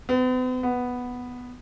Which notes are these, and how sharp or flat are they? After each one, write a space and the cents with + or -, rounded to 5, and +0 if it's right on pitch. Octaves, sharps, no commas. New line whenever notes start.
B3 +45
B3 +0